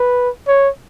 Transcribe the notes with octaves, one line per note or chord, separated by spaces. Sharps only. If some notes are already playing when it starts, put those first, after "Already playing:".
Already playing: B4
C#5